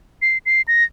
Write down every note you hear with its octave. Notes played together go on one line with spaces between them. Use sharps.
C7
C7
A#6